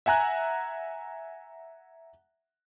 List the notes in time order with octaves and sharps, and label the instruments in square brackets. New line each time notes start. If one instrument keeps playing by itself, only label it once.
[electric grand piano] E5 F#5 G#5 A#5 F#6